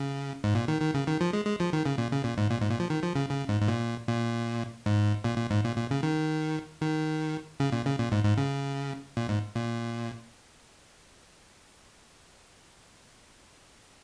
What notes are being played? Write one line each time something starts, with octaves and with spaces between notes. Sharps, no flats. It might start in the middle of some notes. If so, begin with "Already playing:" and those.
Already playing: C#3
G#2
A#2
D#3
D#3
C#3
D#3
F3
G#3
G#3
F3
D#3
C#3
A#2
C#3
A#2
G#2
A#2
G#2
A#2
F3
D#3
F3
C#3
C#3
G#2
G#2
A#2
A#2
G#2
A#2
A#2
G#2
A#2
A#2
C#3
D#3
D#3
C#3
A#2
C#3
A#2
G#2
G#2
C#3
A#2
G#2
A#2